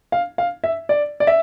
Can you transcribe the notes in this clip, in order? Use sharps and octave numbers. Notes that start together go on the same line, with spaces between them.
F5
F5
E5
D5
D5
E5